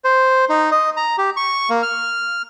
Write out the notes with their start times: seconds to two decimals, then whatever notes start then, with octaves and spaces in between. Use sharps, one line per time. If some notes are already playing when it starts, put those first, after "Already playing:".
0.04 C5
0.50 D#4
0.72 D#5
0.97 A#5
1.18 G4
1.37 C#6
1.70 A#3
1.82 F6